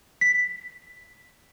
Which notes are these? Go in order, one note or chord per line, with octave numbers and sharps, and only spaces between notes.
B6